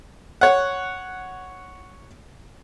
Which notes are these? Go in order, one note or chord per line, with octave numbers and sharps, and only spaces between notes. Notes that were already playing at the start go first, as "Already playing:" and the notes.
C#5 F#5